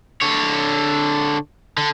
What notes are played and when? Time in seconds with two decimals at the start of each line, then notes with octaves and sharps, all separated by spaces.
0.21 D3 C#5
1.77 D3